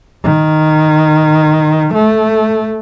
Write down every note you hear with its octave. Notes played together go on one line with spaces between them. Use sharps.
D#3
A3